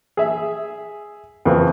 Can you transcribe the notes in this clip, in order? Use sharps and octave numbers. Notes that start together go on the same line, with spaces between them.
G#4 E5
F2 C#3 E3 F3